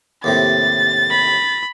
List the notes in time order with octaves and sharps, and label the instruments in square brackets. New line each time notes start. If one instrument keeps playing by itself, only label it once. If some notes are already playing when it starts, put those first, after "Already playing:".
[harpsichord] D#2 A2 C3 [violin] A6
[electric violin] B5